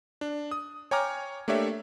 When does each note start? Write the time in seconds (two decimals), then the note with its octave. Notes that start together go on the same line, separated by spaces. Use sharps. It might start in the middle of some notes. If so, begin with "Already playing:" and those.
0.21 D4
0.51 D#6
0.91 C#5 G5 G#5 A#5 D6 F6
1.48 A3 A#3 D4 G4 C#5 E5